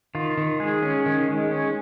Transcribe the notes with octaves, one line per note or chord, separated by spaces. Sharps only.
D#3 F4
D#3
G#3 G#4
C#4
D#3
G#3
C#4